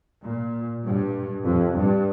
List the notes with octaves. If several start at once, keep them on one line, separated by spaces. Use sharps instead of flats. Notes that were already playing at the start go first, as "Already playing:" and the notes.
A#2
G2
F2
G2